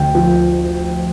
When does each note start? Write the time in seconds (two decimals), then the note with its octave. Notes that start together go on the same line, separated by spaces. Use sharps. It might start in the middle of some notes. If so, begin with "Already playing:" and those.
Already playing: D2 G5
0.15 F3